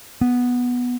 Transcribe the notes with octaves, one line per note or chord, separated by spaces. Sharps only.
B3